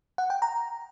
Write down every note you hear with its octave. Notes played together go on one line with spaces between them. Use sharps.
F#5
G5
A#5